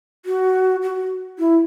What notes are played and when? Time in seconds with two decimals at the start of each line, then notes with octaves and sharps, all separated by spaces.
0.26 F#4
0.82 F#4
1.39 E4